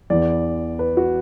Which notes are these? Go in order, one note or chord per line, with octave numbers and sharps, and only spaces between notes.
E2 E3 B3 D5
B4
F#4